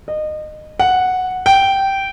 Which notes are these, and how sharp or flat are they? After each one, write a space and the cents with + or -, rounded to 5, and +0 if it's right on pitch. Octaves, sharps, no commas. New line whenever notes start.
D#5 -25
F#5 -5
G5 -10